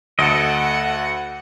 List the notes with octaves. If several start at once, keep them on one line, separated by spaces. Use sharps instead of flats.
D2 A4 D#5 F#5 D7